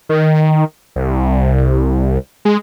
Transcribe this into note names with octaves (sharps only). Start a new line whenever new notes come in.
D#3
C2
G#3